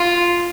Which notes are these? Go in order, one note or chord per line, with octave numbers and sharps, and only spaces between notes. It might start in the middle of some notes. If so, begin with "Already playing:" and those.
Already playing: F4